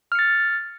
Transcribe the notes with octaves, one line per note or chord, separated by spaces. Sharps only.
F6 A6 C#7